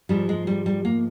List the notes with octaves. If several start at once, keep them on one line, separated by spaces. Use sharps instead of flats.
G#2 F3 G3
G#3
G3
G3
A#3